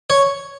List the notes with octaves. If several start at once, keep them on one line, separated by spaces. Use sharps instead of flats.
C#5